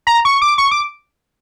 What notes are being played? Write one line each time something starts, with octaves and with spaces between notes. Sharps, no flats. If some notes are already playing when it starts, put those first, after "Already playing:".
A#5
C#6
D6
C#6
D6